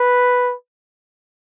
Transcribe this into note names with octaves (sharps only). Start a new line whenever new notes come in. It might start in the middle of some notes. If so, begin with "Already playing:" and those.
Already playing: B4